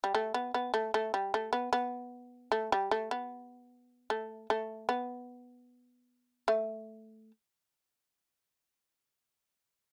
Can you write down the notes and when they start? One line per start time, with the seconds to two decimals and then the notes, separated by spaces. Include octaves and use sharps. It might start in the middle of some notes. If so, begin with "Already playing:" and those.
0.04 G3
0.15 A3
0.34 B3
0.54 B3
0.74 A3
0.94 A3
1.14 G3
1.34 A3
1.53 B3
1.73 B3
2.52 A3
2.72 G3
2.91 A3
3.11 B3
4.10 A3
4.50 A3
4.89 B3
6.48 A3